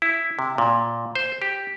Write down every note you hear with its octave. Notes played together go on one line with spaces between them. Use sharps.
E4
C3
A#2
C5
G4